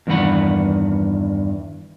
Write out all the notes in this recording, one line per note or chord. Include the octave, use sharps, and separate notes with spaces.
E2 G2 D#3 E3 F#5 B5